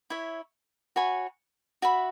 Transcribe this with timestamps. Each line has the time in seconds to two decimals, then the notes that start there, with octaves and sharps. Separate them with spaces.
0.10 E4 C#5 E5
0.96 F#4 C#5 G#5 B5
1.82 F#4 E5 B5